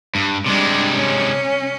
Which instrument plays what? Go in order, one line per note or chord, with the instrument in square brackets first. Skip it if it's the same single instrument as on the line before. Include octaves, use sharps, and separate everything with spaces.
[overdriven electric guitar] G2
[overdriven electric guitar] C3 G#3 [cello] G3 D4
[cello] C#4